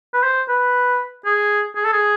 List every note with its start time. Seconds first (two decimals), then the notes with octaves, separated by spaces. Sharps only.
0.13 B4
0.24 C5
0.49 B4
1.25 G#4
1.75 G#4
1.84 A4
1.93 G#4